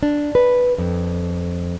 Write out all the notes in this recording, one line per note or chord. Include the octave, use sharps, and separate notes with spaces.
D4
B4
F2